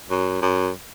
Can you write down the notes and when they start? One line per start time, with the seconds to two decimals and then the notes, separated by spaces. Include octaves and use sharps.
0.10 F#2
0.42 F#2